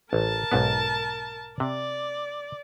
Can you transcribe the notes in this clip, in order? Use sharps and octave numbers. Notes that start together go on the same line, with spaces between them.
A1 A#4 A5
B1 G#2 B3
C3 D5